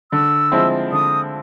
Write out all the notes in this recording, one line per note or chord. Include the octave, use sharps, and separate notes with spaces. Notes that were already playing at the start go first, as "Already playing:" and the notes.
D3 E6
F3 G#3 C4 E4
D3 D#6